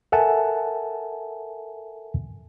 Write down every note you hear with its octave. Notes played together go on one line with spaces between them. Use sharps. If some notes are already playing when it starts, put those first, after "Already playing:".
A4 A#4 E5 F#5 G#5 A5